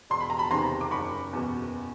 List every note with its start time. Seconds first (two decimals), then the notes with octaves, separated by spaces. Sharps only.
0.10 E1 C6
0.20 B5
0.30 A#5
0.38 A5 B5
0.51 E2 C3 D#3 A#5 C6
0.81 D6
0.91 F#1 B5 C#6
1.33 E2 B2